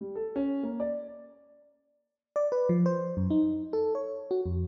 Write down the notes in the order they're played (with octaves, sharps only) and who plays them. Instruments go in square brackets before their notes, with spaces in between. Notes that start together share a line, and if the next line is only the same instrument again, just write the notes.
[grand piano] G3
A4
C#4
A#3
D5
[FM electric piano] D5
B4
F3
C5
F#2
D#4
A4
C#5
F#4
F2